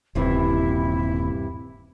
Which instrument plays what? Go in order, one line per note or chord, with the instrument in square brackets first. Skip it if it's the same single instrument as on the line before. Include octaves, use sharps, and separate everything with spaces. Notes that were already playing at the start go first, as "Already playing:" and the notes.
[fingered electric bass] D#1 [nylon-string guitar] G2 C3 E3 [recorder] E4